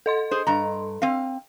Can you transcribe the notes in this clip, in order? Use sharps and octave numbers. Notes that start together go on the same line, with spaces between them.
A4 D#5 C6
G#4 C5
G2 A#5
C4 F5